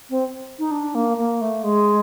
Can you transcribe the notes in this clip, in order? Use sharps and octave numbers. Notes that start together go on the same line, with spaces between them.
C4
D#4
D4
A#3
A#3
A3
G#3